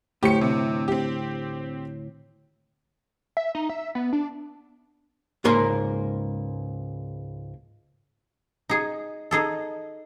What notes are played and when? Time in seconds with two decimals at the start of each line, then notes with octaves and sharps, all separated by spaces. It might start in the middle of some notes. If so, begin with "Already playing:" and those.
0.23 D2 A2 G4 C#7
0.41 C3
0.88 C4 G4
3.37 E5
3.55 D#4
3.69 E5
3.95 B3
4.13 D4
5.45 C#2 G#2 A#3 A#4 C6
8.69 D#4 G#4
9.31 D#4 G#4 A4